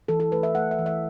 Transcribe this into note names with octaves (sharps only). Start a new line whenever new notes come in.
E3 A4
A4
A3 B4
E5
A3 F#5
E5
E3
E5